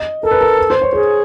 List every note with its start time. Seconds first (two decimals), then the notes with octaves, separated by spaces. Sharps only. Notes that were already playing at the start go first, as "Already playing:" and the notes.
Already playing: D#5
0.23 A4 A#4
0.31 B4
0.41 A#4
0.58 B4
0.70 C5
0.81 C#5
0.93 G#4 C5